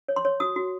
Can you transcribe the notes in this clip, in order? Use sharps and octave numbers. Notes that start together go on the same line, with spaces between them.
C#5
C6
C#5
F#4 D#6
F#4